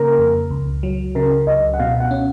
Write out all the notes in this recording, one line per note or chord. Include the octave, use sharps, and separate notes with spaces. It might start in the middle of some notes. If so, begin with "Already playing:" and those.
Already playing: C#3 A#3 A#4
F2
C#2
F#3
C#3 A#4
C#2 D#5
F#5
B2 F5
F#5
C#4